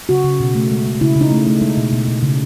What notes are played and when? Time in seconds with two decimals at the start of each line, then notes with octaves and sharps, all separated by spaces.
0.09 C#3 F#4
0.24 C#3
0.40 B2
0.55 A3
0.71 G#3
0.86 G#3
1.01 C#3 E4
1.16 C#3 D#4
1.32 A3
1.47 A3
1.62 G#3 D#4
1.77 B2
1.93 B2
2.08 B2
2.23 C#3